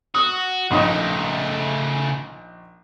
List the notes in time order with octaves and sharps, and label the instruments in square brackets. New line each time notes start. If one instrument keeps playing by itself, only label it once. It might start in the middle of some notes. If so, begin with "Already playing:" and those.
[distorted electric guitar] F#4 [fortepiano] D#6
[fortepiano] A#1 D#4 D#5 [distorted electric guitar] C#3 A3